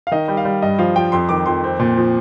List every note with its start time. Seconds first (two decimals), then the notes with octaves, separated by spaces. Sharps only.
0.07 F5
0.11 D#3 D#5
0.28 G3
0.37 F5
0.45 G3
0.62 G2 D#5
0.78 F3 F5
0.96 F3 G5
1.12 F2 C6
1.29 D#3 D6
1.46 F2 C6
1.64 C4
1.79 A#2
1.97 F3